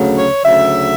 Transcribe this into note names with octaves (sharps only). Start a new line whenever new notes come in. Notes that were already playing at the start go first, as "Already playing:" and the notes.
Already playing: D2 C#3 F#3 A3
C#5
D2 C#3 F#3 E5